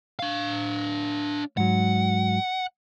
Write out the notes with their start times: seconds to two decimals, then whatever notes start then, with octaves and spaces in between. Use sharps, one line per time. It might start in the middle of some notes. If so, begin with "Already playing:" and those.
0.19 D4 F5
1.57 G#2 F#3 F#5